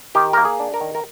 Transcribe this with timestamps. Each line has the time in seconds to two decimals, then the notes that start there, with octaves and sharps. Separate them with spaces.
0.15 D#3 G4
0.33 A#3 A#4
0.45 G#4
0.60 D4
0.74 A#4
0.81 D#3
0.95 A#4